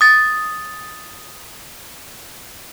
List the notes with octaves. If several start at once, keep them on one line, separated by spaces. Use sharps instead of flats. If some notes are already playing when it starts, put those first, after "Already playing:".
D#6 A6